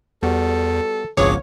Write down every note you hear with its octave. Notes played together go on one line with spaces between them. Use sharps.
E2 G3 B3 F#4 A4
G#1 C#2 G2 F3 B3 G#4 C#5 D6